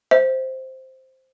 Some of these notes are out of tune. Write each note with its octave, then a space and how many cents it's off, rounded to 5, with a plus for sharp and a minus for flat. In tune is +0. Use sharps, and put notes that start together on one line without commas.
C5 +0 E5 -40